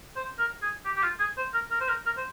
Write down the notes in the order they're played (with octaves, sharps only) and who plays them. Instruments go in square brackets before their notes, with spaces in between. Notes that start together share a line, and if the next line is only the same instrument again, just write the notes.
[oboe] C5
A#4
G#4
G4
G4
F4
G#4
C5
A#4
A#4
C5
A#4
A#4
C5